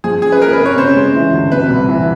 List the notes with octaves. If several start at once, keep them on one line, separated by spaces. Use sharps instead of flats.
F3 G#4
C#4 G#4
B4
A#3 A#4
B4
C3
C#5
C#3 C5
G#3
E3
D2
C3 B4
C2
E3